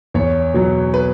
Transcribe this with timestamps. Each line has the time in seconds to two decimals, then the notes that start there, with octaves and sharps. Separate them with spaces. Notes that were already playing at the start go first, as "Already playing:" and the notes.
0.14 E2 C#5
0.54 B2 F#3
0.94 B4